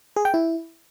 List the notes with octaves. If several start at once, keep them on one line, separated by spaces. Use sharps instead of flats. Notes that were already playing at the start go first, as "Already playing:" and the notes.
G#4
G5
E4